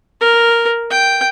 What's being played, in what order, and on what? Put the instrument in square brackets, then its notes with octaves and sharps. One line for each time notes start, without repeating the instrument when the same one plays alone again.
[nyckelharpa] A#4
G5